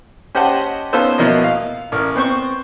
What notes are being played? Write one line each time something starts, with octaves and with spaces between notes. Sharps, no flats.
C#4 G4 C5 D#5 F#5 A5
B3 C#4 D#4 F4 A4 C5
B2 F3 A#3 E4 D#5
F5
A1 A#4
B3 C4 C5 C#6